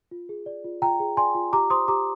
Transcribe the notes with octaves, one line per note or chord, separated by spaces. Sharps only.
F4
G#4
D5
F4
F4 G5 A#5
G#4
D5 G#5 C6
F4
G4 A#5 D6
C5 C6 D#6
G4 A#5 D6